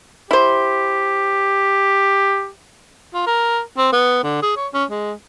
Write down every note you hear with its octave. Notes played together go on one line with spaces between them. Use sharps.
E4 G4 C5
F4
A#4
C4
B3
D3
G#4
C#5
C#4
G#3